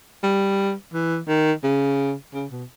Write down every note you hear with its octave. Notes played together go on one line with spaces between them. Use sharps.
G3
E3
D#3
C#3
C#3
B2